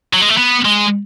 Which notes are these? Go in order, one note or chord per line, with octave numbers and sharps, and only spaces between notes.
F#3
G#3
A3
B3
G#3